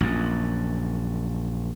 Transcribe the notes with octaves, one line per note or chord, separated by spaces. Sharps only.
A#1 F#2